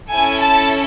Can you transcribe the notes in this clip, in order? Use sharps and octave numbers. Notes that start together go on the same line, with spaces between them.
C#4 E4 A4 G#5
A5